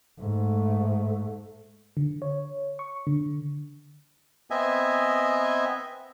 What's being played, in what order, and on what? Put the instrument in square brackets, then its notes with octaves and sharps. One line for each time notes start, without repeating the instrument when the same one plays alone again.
[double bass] G#2 A3
[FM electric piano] D3
C#5
C#6
D3
[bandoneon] B3 C4 D#5 E5 G#5